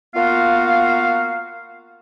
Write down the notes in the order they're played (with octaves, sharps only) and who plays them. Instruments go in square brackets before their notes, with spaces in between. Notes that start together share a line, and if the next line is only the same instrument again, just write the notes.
[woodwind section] A#3 B3 F4 F#4 F5